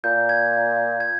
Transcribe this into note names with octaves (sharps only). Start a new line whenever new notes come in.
A#2 G6
G#6
G#6